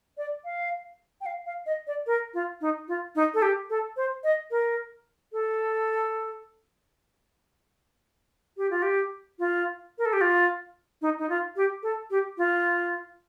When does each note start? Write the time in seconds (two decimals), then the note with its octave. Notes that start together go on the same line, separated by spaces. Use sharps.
0.17 D5
0.45 F5
1.21 G5
1.26 F5
1.46 F5
1.66 D#5
1.87 D5
2.07 A#4
2.34 F4
2.61 D#4
2.88 F4
3.16 D#4
3.34 A4
3.42 G4
3.70 A4
3.97 C5
4.24 D#5
4.51 A#4
5.33 A4
8.57 G4
8.71 F4
8.82 G4
9.39 F4
9.98 A#4
10.06 A4
10.13 G4
10.21 F4
11.02 D#4
11.19 D#4
11.29 F4
11.56 G4
11.83 A4
12.11 G4
12.38 F4